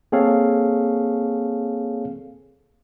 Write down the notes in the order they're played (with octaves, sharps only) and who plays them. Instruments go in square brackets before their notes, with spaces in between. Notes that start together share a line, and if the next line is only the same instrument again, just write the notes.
[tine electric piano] A#3 C4 G#4 A4 C#5 F5